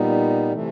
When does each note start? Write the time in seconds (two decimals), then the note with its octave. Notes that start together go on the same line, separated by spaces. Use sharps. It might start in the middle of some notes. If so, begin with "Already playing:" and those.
Already playing: A#2 G3 B3 D#4
0.53 C3 E3 A3